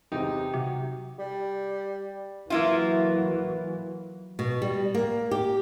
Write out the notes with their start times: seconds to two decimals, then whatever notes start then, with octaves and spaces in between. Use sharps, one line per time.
0.12 E2 C3 D#4 G4
0.54 C3 F#3
1.19 G3
2.50 E3 F#3 A#3 E4 F4
4.39 B2
4.62 G3
4.94 A#3
5.31 G4